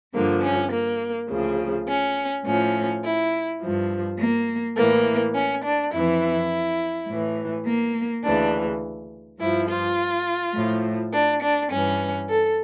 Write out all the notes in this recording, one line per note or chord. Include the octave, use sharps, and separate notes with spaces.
G2 D3 F3 A#3
C#4
A#3
D2 C#3 F3
C#4
A2 F3 C#4
E4
G2 F3
A#3
A2 E3 A#3
C#4
D4
F2 E3 E4
A2 E3
A#3
D2 C#3 E3 D4
G2 F3 E4
F4
A2 F3
D4
D4
G2 E3 C#4
A4